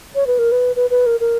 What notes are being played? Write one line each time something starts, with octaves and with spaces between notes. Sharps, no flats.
C#5
B4
A#4
B4
B4
B4
A#4
A#4